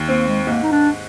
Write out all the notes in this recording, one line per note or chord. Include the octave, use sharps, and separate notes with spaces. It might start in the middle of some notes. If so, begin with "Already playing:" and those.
Already playing: D#2
A#3 C4
G#3
G#2 A#3
D#4
D4